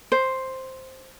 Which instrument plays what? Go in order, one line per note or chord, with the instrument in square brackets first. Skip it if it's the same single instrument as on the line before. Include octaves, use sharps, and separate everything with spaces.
[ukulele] C5